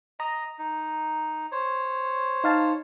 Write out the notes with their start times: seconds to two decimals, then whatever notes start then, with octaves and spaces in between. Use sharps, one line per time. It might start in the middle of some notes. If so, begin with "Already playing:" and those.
0.20 D#5 A#5
0.59 D#4
1.52 C5 C#5
2.44 D#4 F5 A5